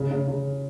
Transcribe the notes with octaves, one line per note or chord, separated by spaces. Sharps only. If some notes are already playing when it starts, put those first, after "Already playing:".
Already playing: C#3
C#3
C#3